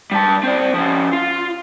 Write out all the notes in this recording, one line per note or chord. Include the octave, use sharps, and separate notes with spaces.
G3 A5
C4 D5
F3 C#4
F4